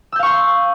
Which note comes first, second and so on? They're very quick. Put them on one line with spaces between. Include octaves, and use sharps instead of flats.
E6 G6 F5 C#6 C6